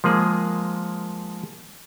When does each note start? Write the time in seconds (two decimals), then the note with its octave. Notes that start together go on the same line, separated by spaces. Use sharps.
0.04 F3 G#3 A#3 G#4